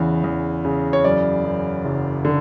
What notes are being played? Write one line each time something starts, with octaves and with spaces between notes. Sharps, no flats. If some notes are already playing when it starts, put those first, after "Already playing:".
Already playing: E2 C#3
E2
C#3
C#5
F#2 D5
F#2
F#1
D3